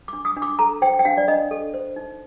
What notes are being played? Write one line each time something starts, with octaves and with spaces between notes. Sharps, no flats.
D4 D6
D#6
D4
D6
A4 A#5
C5 G5
G5
D4 F5
D5
D4 D#5
A4
C5
D#4